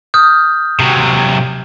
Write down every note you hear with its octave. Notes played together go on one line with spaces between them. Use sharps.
D#6 F6 G6
C3 F#3